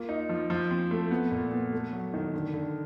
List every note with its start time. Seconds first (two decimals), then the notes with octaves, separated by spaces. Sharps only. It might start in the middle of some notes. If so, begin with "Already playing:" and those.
Already playing: A#3 F4
0.09 D#4
0.29 F3
0.50 F3
0.71 C4
0.91 A3
1.11 B3
1.31 A#2
1.51 B3
1.72 A3
1.92 F#3
2.14 D#3
2.34 D3
2.54 D3